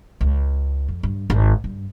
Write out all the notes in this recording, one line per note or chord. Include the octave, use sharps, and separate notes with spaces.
C#2
F2
G2
G#1
G2